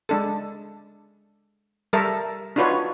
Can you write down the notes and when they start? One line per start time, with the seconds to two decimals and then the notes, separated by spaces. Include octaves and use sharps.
0.09 G#3 D4 A4
1.93 G3 A4 A#4 E5
2.56 D4 D#4 F4 F#4 B4 C#5